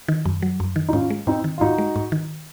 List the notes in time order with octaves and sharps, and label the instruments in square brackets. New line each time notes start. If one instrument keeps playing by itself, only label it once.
[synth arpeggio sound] D#3
F#2
F#3
F#2
D#3
[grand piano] D#4
[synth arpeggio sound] G#2 [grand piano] C#4 F4
[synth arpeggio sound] G#3
[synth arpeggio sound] G#2 [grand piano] C4 D#4
[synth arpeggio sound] D#3
[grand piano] F4
[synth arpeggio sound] G#2 [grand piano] D#4 F#4
[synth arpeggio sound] G#3
G#2
D#3